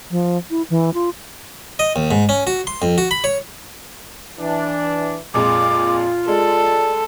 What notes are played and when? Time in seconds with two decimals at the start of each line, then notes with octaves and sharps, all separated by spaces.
0.11 F3
0.50 E4
0.70 E3
0.94 F4
1.79 D#5
1.96 D#2
2.11 G#2
2.29 C#4
2.47 F#4
2.67 C6
2.82 F2
2.98 F#4
3.11 B5
3.24 C#5
4.39 E3 D4
5.34 F2 A#2 G#3 F4 D6
6.28 G#3 A4 D5